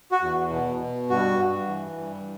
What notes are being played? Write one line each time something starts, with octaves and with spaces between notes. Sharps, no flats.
F#4
E2
B2
B2
G2 F#4
G2
E3
G2